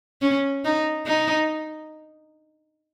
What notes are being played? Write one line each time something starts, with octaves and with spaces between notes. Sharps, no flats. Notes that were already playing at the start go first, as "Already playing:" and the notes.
C#4
D#4
D#4